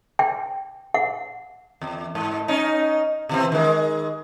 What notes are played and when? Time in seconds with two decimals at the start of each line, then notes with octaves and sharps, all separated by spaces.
0.19 G5
0.94 F#5
1.82 E2
2.15 G#2
2.48 C#4 D#4
3.29 B2 E3 C4
3.52 D#3 G#3